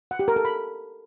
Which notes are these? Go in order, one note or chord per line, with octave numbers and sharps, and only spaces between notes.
F#5
G4
A#4
A4
B5